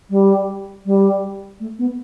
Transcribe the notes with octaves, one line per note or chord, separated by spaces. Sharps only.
G3
G3
A3
B3